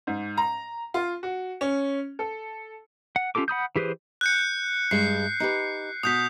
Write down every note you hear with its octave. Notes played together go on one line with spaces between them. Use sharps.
G#2
A#5
F4
F#4
C#4
A4
F#5
C#4 F4 G4 A4 D6
F#5 B5 D#6 G6
E3 G4 G#4 B4 C5
F#6 G6 C#7
G2 G#3 C7
D#4 G4 B4
B2 F#4 D#6 G6 B6